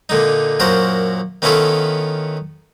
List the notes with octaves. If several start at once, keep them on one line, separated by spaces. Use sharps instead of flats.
A#2 D3 D#4
F#2 A#2 F#4 A#4 C5
D#3 B3 C#4 E4 F4 A4